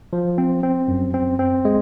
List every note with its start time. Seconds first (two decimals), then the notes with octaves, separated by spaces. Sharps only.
0.13 F3
0.38 C4
0.63 C4
0.88 F#2
1.14 C4
1.39 C4
1.65 G#3